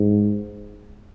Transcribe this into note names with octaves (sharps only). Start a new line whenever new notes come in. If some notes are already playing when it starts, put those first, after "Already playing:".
Already playing: G#2